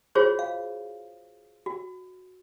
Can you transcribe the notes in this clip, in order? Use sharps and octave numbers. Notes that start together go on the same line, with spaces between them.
F4 F#4 G#4 C5 C#5
F5
F#4